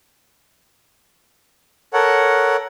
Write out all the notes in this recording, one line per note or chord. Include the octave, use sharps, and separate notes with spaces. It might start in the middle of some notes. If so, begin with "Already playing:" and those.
A4 A#4 C#5 F#5